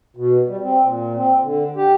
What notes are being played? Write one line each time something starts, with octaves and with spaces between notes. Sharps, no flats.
B2
G3
C4
A#2
C4
D3
G4